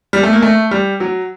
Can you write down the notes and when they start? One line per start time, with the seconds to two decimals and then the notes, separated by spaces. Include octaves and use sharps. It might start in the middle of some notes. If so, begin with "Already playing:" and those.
0.13 G3
0.23 A3
0.33 A#3
0.42 A3
0.71 G3
1.00 F#3